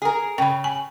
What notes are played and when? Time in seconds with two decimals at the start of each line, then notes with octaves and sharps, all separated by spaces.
0.02 G#4 A#4
0.38 C#3 G5 B5
0.64 G#5